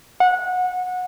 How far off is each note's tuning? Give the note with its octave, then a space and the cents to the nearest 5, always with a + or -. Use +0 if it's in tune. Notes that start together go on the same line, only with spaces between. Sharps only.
F#5 -20